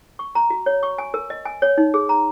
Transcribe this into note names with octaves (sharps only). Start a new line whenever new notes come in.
C#6
A#5
F#4
C#5
C#6
G#5
A#4
D#5
G#5
C#5
D#4
G#4
A#5